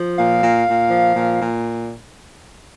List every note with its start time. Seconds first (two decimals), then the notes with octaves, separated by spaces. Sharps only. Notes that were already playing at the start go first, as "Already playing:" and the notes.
Already playing: F3
0.17 A#2 F5
0.41 A#2
0.67 A#2
0.91 F3
1.15 A#2
1.40 A#2